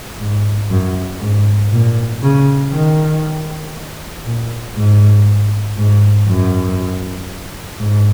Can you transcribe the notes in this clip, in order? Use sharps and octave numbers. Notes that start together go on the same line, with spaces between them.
G#2
F#2
G#2
A#2
C#3
D#3
A#2
G#2
G#2
F#2
G#2